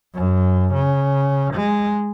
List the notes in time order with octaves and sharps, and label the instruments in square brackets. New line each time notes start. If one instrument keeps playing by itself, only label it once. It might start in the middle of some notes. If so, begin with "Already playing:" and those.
[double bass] F#2
C#3
G#3